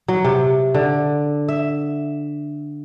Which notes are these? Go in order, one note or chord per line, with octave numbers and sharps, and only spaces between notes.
F#3
C3
D3
E5